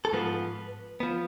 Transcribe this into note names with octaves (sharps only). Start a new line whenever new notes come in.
A4
G#2 F3 B3 B4
F3 B3